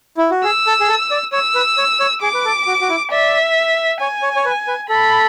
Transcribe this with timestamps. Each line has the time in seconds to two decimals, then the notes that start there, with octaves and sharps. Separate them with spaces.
0.17 E4
0.31 F#4
0.44 G#4 E6
0.67 A4
0.80 G#4
0.88 A4
1.11 D5
1.33 C#5 E6
1.55 B4
1.78 C#5
2.00 C#5
2.22 G#4 D6
2.34 B4
2.45 A4
2.67 F#4
2.81 F#4
2.89 E4
3.11 D5 E5
4.00 C#5 G#5
4.22 C#5
4.36 C#5
4.45 B4
4.68 B4
4.89 A4 B5